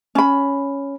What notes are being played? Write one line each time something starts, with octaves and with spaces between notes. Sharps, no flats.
C#4 B5